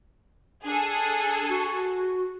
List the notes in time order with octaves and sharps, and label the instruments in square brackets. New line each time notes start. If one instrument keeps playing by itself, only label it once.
[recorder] D4 [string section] G#4 A4
[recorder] F#4